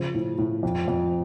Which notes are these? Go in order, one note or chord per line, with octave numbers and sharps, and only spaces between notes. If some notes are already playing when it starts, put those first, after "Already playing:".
Already playing: C#3 F3
A2
A2
F2
F2